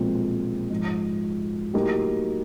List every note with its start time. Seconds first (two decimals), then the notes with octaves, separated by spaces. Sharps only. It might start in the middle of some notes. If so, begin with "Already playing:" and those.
Already playing: B1 A#2 F3 G#3 C4
0.70 G#2 F3 G#3
1.74 A2 F#3 A#3 D#4 G4